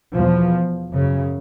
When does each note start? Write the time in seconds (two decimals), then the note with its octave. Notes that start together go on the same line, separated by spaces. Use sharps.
0.15 E2 B2 F3
0.92 F#2 C#3